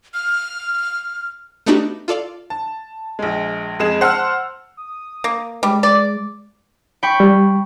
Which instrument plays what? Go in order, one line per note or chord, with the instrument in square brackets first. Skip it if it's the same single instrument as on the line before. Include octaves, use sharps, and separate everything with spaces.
[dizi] F6
[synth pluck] A3 B3 D4 D#4 F#4 G4
F4 A4 D5 F5
[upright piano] A5
A#1 G#3
F2 G#3 G#4 E7
C5 F#5 A5 E6 F6
[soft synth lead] D#6
[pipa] A#3
[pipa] G3 [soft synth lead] G#3
[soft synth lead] G#3 [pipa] D5
[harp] G5 B5 C#6
[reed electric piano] G3